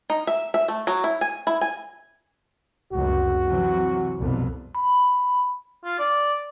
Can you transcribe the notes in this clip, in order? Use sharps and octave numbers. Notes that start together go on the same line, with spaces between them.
D#4
E5
E5
A3
F#3
E4
G#5
E4
G#5
F1 C#2 F#2 F#4
C3 E3 F#3
C2 F2 B2
B5
F4
D5